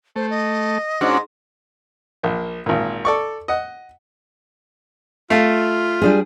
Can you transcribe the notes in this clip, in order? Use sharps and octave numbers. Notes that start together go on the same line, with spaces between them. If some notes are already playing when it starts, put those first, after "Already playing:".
A3 C5
D#5
G#2 C#4 D4 F#4
A#1 A#3
G#1 A#2
A4 D5 C#6
D#5 F#5
A3 F4 F5
G3 D4 G#4